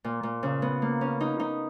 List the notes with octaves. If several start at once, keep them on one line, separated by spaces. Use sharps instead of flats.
A#2
A#2
C#3
B3
A#3
C#4
D#4
D#4